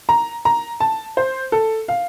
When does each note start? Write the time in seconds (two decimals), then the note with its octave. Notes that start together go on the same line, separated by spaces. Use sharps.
0.09 A#5
0.45 A#5
0.80 A5
1.17 C5
1.52 A4
1.88 F5